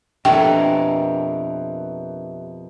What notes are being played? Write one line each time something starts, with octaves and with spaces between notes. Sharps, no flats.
F2 B2 A#3 D4 G4 E5 G5 G#5